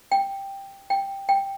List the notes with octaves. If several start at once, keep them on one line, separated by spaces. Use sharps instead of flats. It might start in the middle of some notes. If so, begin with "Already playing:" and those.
G5
G5
G5